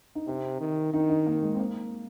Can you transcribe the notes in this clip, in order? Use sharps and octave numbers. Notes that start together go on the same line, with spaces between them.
D#4
C3 C4
D#3
D#3 D#4
D#4
A#3
G#3
C4
A#3